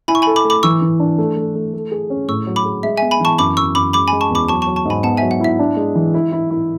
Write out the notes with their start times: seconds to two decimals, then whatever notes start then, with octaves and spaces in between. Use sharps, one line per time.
0.08 E4 G#5 B5
0.15 C#6
0.22 A4 G#5 B5
0.36 B5 D6
0.45 A3
0.50 B5 D6
0.63 E3 C#6 E6
0.82 E3
1.00 D4
1.18 A3
1.37 A3
1.55 A3
1.74 A3
1.92 G#4
2.10 C#4
2.28 A2 C#6 E6
2.47 F#3
2.56 B5 D6
2.65 G#4
2.83 G#3 E5
2.97 B3 E5 G#5
3.11 G#5 B5
3.20 E3 A5 C#6
3.38 F#2 B5 D6
3.57 F#2 C#6 E6
3.75 F#2 B5 D6
3.93 G#3 B5 D6
4.08 G#5 B5
4.12 G#3
4.21 A5 C#6
4.30 E2 B5 D6
4.49 F#3 A5 C#6
4.62 F#3 A5 C#6
4.76 A5 C#6
4.85 G#2 G#5 B5
5.03 B3 F#5 A5
5.17 F#3 E5 G#5
5.31 F#5
5.40 E4 E5
5.59 D4
5.77 G#3
5.95 E3
6.14 E4
6.32 E4
6.51 E4